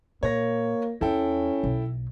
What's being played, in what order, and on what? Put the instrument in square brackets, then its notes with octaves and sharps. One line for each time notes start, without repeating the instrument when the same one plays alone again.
[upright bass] A#2 [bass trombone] A#3 [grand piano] C#5 A#6
[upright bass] E2 [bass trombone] C#4 [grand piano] E4 A4 G5
[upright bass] B1